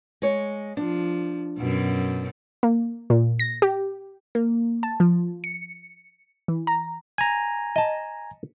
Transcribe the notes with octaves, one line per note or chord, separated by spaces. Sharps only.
G#3 C#5
F3 D4
F#2 B2
A#3
A#2
A#6
G4
A#3
A5
F3
C#7
E3
A#5
G#5 A#5
D#5 A5